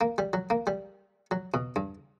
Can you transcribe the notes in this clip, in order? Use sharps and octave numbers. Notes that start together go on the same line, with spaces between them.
A#3
G3
F#3
A#3
G3
F#3
B2
G2